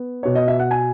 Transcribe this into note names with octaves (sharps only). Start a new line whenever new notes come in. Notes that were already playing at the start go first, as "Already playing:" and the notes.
Already playing: B3
B2 C#5
D#5
E5
F#5
G#5